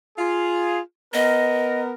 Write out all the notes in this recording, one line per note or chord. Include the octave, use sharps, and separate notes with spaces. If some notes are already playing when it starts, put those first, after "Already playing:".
F4 G#4
B3 A#4 D#5